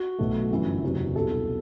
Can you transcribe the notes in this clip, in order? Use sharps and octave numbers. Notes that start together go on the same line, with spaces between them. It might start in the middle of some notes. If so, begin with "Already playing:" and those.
Already playing: F#4
B1 B2 F#3 A3
G1 F#2 E3
F#1 E2 C3 F#3
C2 B2 G3 A4